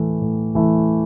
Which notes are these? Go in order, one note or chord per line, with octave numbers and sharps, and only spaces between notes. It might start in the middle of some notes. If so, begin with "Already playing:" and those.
Already playing: A2 E3 A3 E4
A2
E3 A3 E4